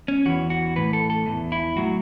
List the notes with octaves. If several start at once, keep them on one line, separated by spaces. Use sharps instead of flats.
C#4
E2 E3 F#4
F#4
A2 E3 B4
A4
A4
E2 E3
E4
A2 F#3 F#4